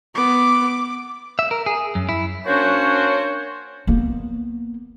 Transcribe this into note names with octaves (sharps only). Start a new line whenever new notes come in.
B3 D6
E5
A#4
G#4
F#2
E4
A#3 C#4 D4 F#4 C5 C#5
A#3 B3